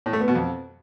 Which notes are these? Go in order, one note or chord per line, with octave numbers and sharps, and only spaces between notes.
A2
A3
B3
B2
F2